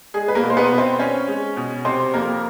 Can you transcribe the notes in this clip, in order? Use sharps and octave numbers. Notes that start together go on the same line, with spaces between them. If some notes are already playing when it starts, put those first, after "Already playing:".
G#3 G#4
B4
A#3 A#4
B2
C5
B3 B4
B2
C4 C5
C4 C#4 C#5
G#3
B2
C3 C4 C5
F2 A#3 A#4